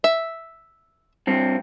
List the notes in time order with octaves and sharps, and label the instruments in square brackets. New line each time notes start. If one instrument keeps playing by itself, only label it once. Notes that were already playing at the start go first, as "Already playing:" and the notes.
[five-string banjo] E5
[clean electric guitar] G2 C4